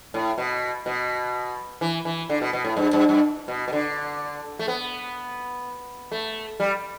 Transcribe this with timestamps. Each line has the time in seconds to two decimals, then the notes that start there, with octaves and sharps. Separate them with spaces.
0.14 A2
0.38 B2
0.86 B2
1.81 E3
2.05 E3
2.30 D3
2.41 B2
2.53 B2
2.65 A2
2.77 G2
2.93 G2
3.09 G2
3.48 B2
3.68 B2
3.73 D3
4.59 A3
4.68 B3
6.12 A3
6.60 G3